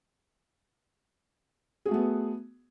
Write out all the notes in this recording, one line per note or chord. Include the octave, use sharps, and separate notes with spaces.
A3 B3 F#4 G#4